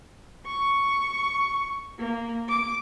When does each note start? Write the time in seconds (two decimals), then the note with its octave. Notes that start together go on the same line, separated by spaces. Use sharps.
0.47 C#6
1.99 A#3
2.49 D6